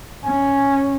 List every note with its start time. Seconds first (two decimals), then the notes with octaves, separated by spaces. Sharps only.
0.25 C#4 G#5